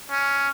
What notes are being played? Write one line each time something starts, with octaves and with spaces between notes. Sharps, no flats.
C#4